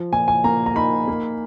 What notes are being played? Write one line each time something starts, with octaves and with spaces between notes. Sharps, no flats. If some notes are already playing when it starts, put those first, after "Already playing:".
Already playing: F3
A#2 G#5
G#5
A#3 A#5
A#5
D#4 B5
A#3